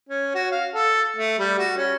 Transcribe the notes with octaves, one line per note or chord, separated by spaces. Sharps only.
C#4
F#4
F5
A4
A3
G3
F#4
C#4